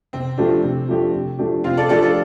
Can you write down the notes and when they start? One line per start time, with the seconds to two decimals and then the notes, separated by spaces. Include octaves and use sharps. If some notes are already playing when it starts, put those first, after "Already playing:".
0.13 C3 C4
0.38 F3 A3 D4 G4
0.64 C3
0.89 F3 A3 D4 G4
1.14 C3
1.39 F3 A3 D4 G4
1.64 C3 C4 F4
1.77 A4 D5
1.89 F3 A3 D4 G4 A4 D5
2.02 A4 D5